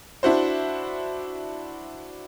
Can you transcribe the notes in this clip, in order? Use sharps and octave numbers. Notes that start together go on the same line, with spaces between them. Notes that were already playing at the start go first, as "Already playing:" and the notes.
D4 E4 F#4 C5